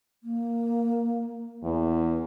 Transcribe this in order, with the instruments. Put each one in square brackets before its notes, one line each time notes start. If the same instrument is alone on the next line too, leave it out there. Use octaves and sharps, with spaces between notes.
[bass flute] A#3
[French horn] E2 [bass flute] B4